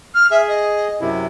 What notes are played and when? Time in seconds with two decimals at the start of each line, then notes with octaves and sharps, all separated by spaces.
0.14 F6
0.31 G#4 E5
0.48 D#5
1.01 F#2 C3 E4